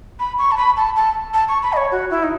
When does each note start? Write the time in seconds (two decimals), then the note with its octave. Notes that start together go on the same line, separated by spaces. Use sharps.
0.20 B5
0.38 C#6
0.52 A5
0.57 B5
0.77 A5
0.96 A5
1.34 A5
1.49 C#6
1.63 B5
1.73 D#5
1.77 C#5
1.92 F#4
2.11 E4
2.23 D#4